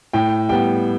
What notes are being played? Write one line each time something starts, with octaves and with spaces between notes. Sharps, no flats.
A2 G5
G3 B3 G5